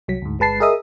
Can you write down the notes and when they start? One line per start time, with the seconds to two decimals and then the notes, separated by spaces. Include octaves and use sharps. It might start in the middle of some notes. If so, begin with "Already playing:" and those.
0.08 C2 F#3 B6
0.22 D2 G#2
0.39 G1 G#3 B4 A5 C7
0.60 G#4 A#4 D#5 E5 D#6